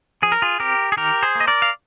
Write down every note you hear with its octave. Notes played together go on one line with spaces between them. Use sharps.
F3 G#4
A#4
F4 G#4
C4 G4 A#4
G#4
D#3 G4 A#4
G#4 C5
A#3
D#5
A#4 D5
F5